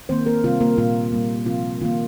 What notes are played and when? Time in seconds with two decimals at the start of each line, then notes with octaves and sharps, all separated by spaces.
0.09 D#3 A#3 C4 C5
0.26 A#3 A#4
0.44 C3 D#3 G3 C4 F4
0.60 A#3 A#4
0.78 A#2 G3 A#3 F4
1.12 A#2 G3 A#3
1.46 C3 F3 C4 F4
1.81 D#3 F4
1.85 A#3